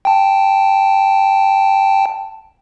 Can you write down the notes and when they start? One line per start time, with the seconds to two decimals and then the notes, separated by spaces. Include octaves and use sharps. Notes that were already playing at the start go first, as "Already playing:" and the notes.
0.05 G5 A5